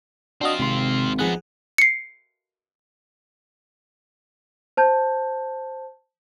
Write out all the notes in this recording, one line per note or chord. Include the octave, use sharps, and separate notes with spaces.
C4 D4 F4 F#4 D#5
G#1 C3 C6
F3 B3 D#4 G#4 F#5
C7 C#7
C5 A5 G6